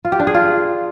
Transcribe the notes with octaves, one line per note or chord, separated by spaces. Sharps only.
F4
G4
D4
G#4
F4